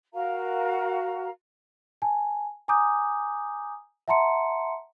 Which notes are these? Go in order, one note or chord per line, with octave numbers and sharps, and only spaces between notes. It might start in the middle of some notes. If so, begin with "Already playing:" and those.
F#4 A#4 F5 A#5
G#5 A5
G#5 A#5 D6 D#6 G6
E5 F#5 A5 A#5 C6 C#7